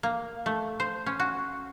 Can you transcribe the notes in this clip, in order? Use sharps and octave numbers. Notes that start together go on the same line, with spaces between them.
A#3
A3
C5
C#4
F#4